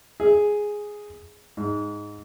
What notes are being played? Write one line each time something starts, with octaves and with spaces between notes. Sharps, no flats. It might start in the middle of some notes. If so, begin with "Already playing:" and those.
G#4
G#2